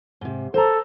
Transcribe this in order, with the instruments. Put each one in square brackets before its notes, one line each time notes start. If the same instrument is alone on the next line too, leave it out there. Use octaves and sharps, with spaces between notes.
[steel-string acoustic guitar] G#2 C3
[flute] A4 [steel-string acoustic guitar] C5 A#5